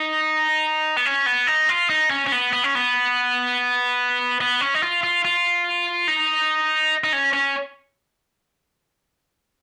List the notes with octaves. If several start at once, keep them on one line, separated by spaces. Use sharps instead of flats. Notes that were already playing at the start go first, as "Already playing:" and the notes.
Already playing: D#4
B3
C#4
B3
D#4
F4
D#4
C#4
C#4
B3
B3
C#4
B3
B3
C#4
D#4
F4
F4
F4
D#4
D#4
C#4
C#4